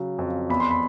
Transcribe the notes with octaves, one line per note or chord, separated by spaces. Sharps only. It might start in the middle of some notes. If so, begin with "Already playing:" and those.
Already playing: C#3 F#3
F2
E2 B5
C6
B5